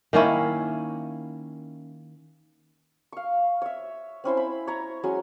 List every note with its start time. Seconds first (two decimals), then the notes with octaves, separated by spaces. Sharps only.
0.13 D#3 A#3 C#4 E4
3.12 F5 C#6
3.62 C#5 E5
4.24 C4 C#4 E4 C5
4.37 B5
4.67 C#5 A#5 C#6
5.03 F#3 G#3 C#4 G#5